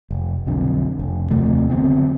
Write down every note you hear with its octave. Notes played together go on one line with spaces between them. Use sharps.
F1
B1 F2 D3
F1
D#2 C3 F3 A3
F#1 D3 B3 C4